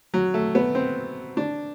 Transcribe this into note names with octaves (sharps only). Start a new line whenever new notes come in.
F#3
A3
B3
C4
D4